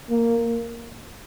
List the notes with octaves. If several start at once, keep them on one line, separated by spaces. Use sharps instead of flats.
A#3